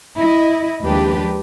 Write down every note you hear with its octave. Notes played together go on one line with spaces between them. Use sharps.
E4 D#5
D#2 F3 G#3 D4 G4 B4